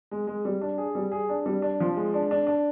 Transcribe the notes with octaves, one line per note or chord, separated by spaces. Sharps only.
G#3
G#3
G3
D4
G#4
G3
G#4
D4
G3
D4
F3
G#3
D4
D4
D4